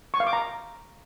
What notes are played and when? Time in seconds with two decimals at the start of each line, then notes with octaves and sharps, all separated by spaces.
0.14 C#6
0.20 F5
0.27 D6
0.33 A#5